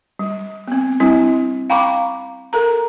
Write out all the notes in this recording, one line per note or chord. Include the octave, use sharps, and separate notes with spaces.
G3
B3 C4
G3 C4 D4 E4
F5 G5 A#5 B5 C#6 D6
A4 A#4 A#5